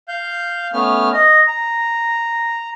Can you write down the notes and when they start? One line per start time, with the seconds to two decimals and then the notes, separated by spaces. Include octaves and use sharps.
0.08 F5 G6
0.73 A3 B3 C#4 F6
1.13 D#5
1.47 A#5